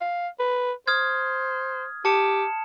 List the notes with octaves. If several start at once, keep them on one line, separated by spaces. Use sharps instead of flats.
F5
B4
C5 D#6 F6 G#6
G4 A5 C#7 E7